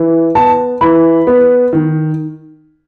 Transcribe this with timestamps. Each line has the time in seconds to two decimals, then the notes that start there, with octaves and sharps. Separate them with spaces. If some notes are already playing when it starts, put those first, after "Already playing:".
Already playing: E3
0.35 B3 A5
0.81 E3 B5
1.27 B3
1.73 D#3